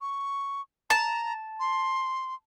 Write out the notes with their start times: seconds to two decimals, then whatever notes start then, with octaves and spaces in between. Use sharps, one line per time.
0.01 C#6
0.90 A5 A#5
1.60 C6